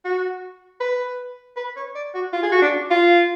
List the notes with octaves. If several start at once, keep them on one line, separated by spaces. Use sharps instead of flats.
F#4
B4
B4
C#5
D5
F#4
F4
G#4
F#4
D4
F4